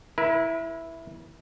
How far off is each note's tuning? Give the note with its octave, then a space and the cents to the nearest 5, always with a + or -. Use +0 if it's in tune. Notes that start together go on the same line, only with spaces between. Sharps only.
E4 +0 A#4 +45